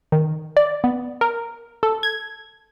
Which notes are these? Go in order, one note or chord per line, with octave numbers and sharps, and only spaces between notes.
D#3
D5
B3
A#4
A4
G#6